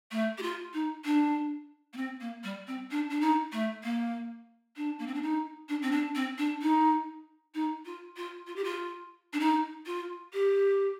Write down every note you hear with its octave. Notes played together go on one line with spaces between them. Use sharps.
A3
G4
F4
D#4
D4
A#3
C4
A#3
G3
C4
D4
D4
D#4
A3
A#3
D4
A#3
C4
D4
D#4
D4
C4
D4
C4
D4
D#4
D#4
F4
F4
F4
G4
F4
D4
D#4
F4
G4